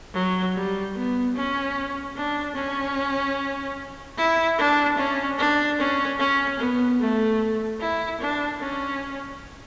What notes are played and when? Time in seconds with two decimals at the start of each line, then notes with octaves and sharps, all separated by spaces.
0.14 F#3
0.55 G3
0.95 B3
1.35 C#4
2.16 D4
2.56 C#4
4.17 E4
4.58 D4
4.98 C#4
5.38 D4
5.79 C#4
6.19 C#4
6.59 B3
7.00 A3
7.81 E4
8.21 D4
8.61 C#4